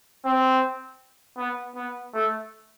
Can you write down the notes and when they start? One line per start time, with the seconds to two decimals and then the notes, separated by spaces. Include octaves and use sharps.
0.25 C4
1.38 B3
1.76 B3
2.14 A3